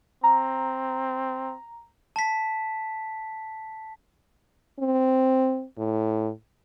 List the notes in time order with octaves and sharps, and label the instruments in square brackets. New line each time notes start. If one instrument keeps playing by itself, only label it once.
[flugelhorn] C4 [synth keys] A#5
[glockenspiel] A5 B6
[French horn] C4
A2